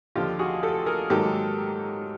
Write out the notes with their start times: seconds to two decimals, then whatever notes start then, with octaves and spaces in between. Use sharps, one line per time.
0.16 D#2 D3 F3 F4 G4
0.39 F#4 G#4
0.63 G4 A4
0.86 G#4 A#4
1.10 G#2 D#3 F#3 A#3 G4 A4